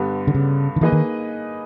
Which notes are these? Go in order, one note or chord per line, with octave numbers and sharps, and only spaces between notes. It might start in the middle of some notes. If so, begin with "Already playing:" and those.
Already playing: G2 D3 G3 B3
D3
C#3
D#3
E3 A#3 D#4 G#4 B4 D#5
D#3